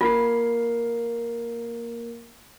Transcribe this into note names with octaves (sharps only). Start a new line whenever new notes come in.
A#3 F4 A#4 C7